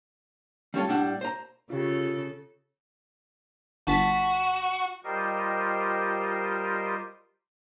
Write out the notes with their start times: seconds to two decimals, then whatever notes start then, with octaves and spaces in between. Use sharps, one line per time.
0.74 G3 A3 C#4 F4 A4
0.88 A2 G3 D4 F#5
1.21 C5 A#5
1.70 C#3 F4 G4 A4
3.87 G1 F#4 A5 B6
5.04 G3 F4 G4 A#4 C5 D#5